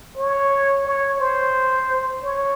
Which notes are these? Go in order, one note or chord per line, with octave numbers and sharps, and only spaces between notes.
C#5
C#5
C5
C#5